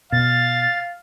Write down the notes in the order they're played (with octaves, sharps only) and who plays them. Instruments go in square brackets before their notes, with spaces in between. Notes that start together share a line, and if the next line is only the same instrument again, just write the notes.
[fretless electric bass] B2 [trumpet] F5 [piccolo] A6